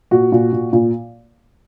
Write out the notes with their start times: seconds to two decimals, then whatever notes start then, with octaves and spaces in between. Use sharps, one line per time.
0.11 A#2 F#4
0.32 A#2
0.52 A#2
0.73 A#2